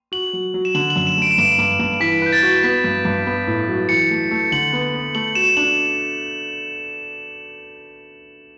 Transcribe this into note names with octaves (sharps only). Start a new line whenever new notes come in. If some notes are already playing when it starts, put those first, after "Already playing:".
F#4 F#7
F#3
F#3
E7
D3 F#7
F#7
F#2
E7
A3 D7
E7
G2 D7
G2
G2
E3 B6
B4 G6
A6
F#4
B3 B6
G2
G2
B3
A2
F#3
E3 C#7
A3
A3
D3 F#7
B3
B3
A3 F#7
F#4 E7
D4 F#7